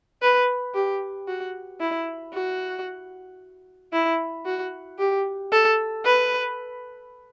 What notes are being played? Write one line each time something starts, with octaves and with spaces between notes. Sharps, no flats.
B4
G4
F#4
E4
F#4
E4
F#4
G4
A4
B4